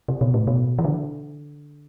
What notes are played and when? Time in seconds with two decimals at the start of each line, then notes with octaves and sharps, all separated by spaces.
0.08 C3
0.21 B2
0.34 A2
0.47 B2
0.79 E3
0.85 D3